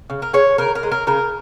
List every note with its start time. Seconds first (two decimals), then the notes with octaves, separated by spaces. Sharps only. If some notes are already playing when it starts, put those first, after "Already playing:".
0.10 C#3
0.22 A#4
0.33 G#3 C#5
0.58 C#3 A#4
0.75 A#4
0.83 G#3
0.92 A#4
1.07 C#3 A#4